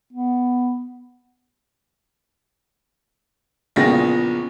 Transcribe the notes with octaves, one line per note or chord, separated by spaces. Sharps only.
B3
A#1 E2 C#3 F4 G#4 A#6